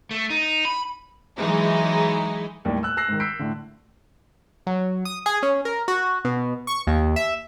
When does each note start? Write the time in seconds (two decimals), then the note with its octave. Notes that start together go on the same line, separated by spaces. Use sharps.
0.11 A3
0.30 D#4
0.65 B5
1.38 E3 F#3 G#3 D#4 E4
2.65 D#2 A2 G3
2.83 E6 F#6
2.97 E6 F#6 A#6 C7
3.08 G#2 D#3
3.20 E6 G6 B6 C7 D7
3.39 A2 D3
4.67 F#3
5.05 D#6
5.26 G#4
5.43 C#4
5.65 A#4
5.88 F#4
6.25 B2
6.67 C#6
6.87 D#2
7.16 E5